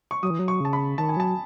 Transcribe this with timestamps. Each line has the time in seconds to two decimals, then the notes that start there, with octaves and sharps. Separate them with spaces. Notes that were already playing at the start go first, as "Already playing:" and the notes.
0.11 C#6
0.22 F#3 D#6
0.30 E3
0.39 F#3
0.48 C#6
0.60 C#3 A5
0.73 B5
0.98 D#3 A5
1.09 G#5
1.17 F#3 A5